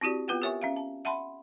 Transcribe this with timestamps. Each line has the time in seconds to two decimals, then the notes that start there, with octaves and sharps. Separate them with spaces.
0.01 C4 E4 F#4 G4 D5
0.28 B3 F4 B4 F#5 G5
0.42 G4 A#4 C#5 E5 G#5 C#6
0.62 C#4 E5 F5
0.76 A5
1.05 E5 F#5 A5 B5 C6